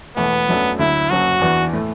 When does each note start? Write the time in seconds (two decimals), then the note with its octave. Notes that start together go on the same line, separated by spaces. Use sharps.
0.17 E1 E2 B2 A3 B3
0.48 F#2 F#3 A3 D4
0.79 D2 D3 F#3 E4
1.10 F#1 F#2 F#3 F#4
1.41 E2 E3 B3 D4
1.73 A2 A3